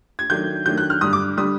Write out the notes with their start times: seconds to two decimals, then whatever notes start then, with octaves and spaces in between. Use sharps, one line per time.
0.19 G#6
0.30 D#3 F#3 A3 D4 G6
0.66 D#3 F#3 A3 D4 G6
0.78 F#6
0.90 F6
1.01 G2 D3 G3 D#6
1.13 D6
1.37 D3 G3 D#6